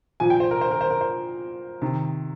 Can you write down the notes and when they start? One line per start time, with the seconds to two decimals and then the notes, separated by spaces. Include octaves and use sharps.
0.20 A#2 F3 G#5
0.30 G5
0.40 C5
0.51 A#4
0.61 C5
0.71 A#4
0.81 C5
0.91 A#4
1.01 C5
1.82 C3 D#3